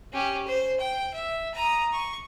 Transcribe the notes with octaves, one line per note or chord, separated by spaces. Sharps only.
C#4 G4
C5
G5
E5
A#5 D#6
C#6